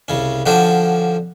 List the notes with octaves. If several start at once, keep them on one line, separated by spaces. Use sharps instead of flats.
C2 C#3 C#4
D3 F3 C#4 D4 F#4 G4